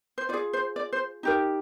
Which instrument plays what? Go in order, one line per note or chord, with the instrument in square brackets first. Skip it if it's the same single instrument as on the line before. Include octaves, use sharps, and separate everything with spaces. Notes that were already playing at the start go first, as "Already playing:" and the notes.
[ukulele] C5
F4 D5
G#4
C5
D5
C5
D#4 G4 A#4